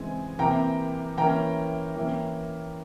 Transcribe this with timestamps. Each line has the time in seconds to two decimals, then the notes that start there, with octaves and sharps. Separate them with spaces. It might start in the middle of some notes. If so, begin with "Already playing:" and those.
Already playing: C#3 E3 G#3 C4 G#5
0.39 C3 E3 A#3 G5 A#5
1.18 E3 A#3 C#4 G5 A#5
1.96 E3 A#3 C#4